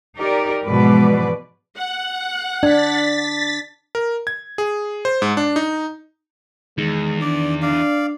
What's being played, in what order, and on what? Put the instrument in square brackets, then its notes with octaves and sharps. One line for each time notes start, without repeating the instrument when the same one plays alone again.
[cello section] D#4 G4 A#4 D5
G#2 B2 E3 F3 B4 D5
[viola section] F#5
[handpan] D4 [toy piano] D5 [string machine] A6 B6
[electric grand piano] A#4
G#6
G#4
C5
G#2
D4
D#4
[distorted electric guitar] E2 [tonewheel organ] D#3 [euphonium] G#3
[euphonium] D4 [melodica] D5
[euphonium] D4 [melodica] D5 F5